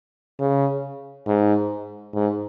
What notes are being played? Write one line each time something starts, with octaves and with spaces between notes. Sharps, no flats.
C#3
G#2
G#2